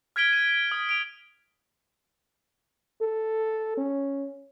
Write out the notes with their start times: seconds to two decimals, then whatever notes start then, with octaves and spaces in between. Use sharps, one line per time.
0.16 F6 G#6 B6 D7 G7
0.33 D#7
0.72 D#6
0.89 D7 F7
3.02 A4
3.77 C#4